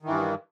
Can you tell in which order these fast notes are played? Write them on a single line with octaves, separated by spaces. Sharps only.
D#3 E3 G2